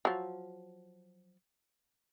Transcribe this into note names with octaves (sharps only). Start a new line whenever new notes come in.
F3 F#3